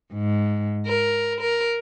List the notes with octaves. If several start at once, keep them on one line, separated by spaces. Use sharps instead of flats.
G#2
A#4
A#4